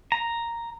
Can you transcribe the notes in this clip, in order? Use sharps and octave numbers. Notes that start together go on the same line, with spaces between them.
A#5